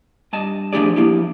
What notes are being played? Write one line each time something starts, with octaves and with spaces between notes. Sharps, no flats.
G2 D#5 A5
F3 A3 D4 G4 G#4 D5
F3 A#3 E4 G4